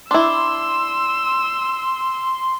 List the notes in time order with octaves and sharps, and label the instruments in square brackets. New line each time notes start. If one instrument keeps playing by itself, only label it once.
[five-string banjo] D4 E4 [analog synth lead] C6 [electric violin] E6